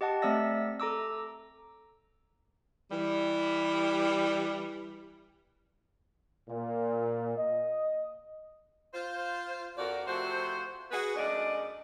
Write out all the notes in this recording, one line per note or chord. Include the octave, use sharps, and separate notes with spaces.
G4 D#5 F#5 A5
A3 C4 D5 E5 E6 A#6
A4 A#5 D6 E6
E3 G3
A#2
D#5
F4 C5
F2 F3 D4 F#4 A#4 D5
C3 F3 A3 F#4 C5
F#4 G#4 B4
F#2 G#3 A3 D4 D5 D#5